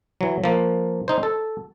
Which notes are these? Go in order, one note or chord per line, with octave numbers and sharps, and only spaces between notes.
E3 F#3
F3 A#3
D#4 C5
A4